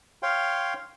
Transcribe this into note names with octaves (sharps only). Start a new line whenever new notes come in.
C#5 F5 G5 C6